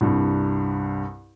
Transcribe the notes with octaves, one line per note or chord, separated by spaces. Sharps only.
C2 G2